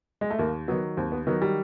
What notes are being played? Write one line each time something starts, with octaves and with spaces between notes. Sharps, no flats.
G#3
A3
D#2 A#3
D#3 F#3 B3
D#2 C4
B3
D#3 F#3 B3
G3